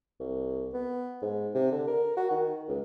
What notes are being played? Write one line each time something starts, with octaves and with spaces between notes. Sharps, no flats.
C2
B3
G#2
C3
D3
A#4
F#4
D#3
C#2